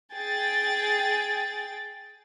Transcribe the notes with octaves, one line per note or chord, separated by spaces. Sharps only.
G#4 G5 A6